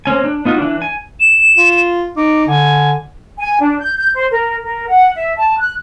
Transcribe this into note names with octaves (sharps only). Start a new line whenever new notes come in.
A#3 C4 C#4 G#5
D4
B3 D#4 F4 F#4
E3 D4
G#5
E7
F4
D#4 D6
D3 G#5
G#5
D4
G6
G6
C5
A#4
A#4
F#5
E5
A5
F#6